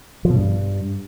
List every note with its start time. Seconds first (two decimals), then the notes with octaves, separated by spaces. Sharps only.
0.25 F3
0.30 B2
0.35 G2